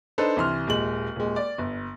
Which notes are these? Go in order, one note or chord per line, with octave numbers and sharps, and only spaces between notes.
D4 D#4 A4 B4 C5
C2 E3 C6 F6
D#1 G#3 F#7
D#1 G#3
D5
G1